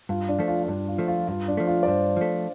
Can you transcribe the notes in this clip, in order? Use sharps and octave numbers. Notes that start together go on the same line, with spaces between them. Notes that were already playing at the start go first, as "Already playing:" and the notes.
G2 F4
D4
F3 A3
F4
F4
G2 D4
F4
F3 A3
F4
G2 F4
D4
F3 A3
F4
D5
G2 C5
F3 A3